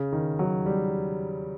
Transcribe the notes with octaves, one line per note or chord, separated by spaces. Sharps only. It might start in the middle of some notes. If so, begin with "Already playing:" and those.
Already playing: C#3
D#3
F#3
G3